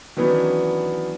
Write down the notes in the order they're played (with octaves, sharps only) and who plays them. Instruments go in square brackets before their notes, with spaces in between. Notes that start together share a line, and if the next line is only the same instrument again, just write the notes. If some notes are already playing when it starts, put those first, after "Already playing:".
[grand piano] D#3 E3 F#3 B3 C#4 D4